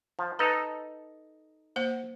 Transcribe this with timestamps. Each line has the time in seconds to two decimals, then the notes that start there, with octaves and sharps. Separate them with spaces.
0.19 F3
0.39 D#4 A4 B4 A#5
1.76 A#3 C5 F#5